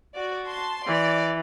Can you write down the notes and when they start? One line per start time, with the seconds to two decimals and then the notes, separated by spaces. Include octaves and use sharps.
0.16 F#4 D5
0.47 A5 C6
0.86 E3 D5